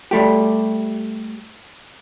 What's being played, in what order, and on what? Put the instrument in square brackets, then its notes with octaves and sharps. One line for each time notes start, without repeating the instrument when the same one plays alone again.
[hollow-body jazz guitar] G3 A3 G4